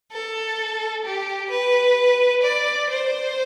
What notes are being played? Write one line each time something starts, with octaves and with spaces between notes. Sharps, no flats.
A4
G4
B4
D5
C5